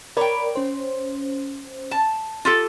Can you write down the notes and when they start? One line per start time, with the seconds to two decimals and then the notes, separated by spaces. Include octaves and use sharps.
0.17 A#4 C#5 D5 G5 B5
0.56 C#4 C5
1.91 A5
2.45 F4 G4 A4